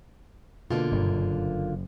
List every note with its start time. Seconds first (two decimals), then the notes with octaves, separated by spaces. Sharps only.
0.70 B2 D3 A#3 F4
0.92 F#1 G2